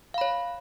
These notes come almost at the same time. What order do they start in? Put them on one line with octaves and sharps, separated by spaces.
F5 B5 C#5